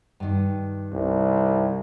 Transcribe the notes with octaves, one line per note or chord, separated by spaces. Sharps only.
G2 D#3
C2